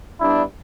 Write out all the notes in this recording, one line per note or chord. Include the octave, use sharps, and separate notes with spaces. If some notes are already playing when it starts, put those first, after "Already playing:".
G3 B3 D4 E4